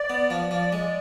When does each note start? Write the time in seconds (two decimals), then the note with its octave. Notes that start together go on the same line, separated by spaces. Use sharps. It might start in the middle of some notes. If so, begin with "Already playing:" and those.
Already playing: D5
0.10 B3
0.30 F3
0.51 F3 D5
0.73 G#3
0.82 D5